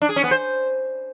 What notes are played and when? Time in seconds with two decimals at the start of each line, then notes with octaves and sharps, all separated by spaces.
0.02 D4
0.09 G#4
0.16 C#4
0.24 B3
0.31 C5